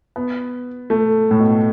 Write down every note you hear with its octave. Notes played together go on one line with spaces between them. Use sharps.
B3
A3
A2
B2